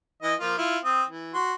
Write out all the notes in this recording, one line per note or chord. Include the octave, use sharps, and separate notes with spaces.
E3 D#5
F3 A#3 F4
E4 F4
C4 D#6
E3
F#4 C6